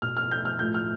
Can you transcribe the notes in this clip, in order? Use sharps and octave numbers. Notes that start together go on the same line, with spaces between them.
B2 F6
F6
G6
F6
A2 F3 G6
F6